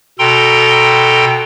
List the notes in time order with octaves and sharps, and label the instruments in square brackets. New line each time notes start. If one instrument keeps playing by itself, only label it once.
[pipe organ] B2 A4 G5 A#5 C6